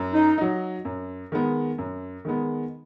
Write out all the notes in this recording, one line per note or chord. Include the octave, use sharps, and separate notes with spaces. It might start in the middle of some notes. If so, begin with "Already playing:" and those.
Already playing: F#2
D#4
F#3 D#4
F#2
D#3 G#3 B3
F#2
D#3 G#3 B3